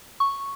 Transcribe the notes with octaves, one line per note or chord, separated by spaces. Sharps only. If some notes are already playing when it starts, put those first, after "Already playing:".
C#6